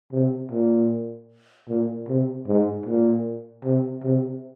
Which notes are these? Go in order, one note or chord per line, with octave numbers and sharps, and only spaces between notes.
C3
A#2
A#2
C3
G#2
A#2
C3
C3